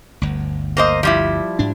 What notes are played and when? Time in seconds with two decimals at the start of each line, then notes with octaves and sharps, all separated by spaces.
0.22 G1 D2
0.77 A#3 C5 D#5
1.03 F3 G3 E4
1.59 G#2 D4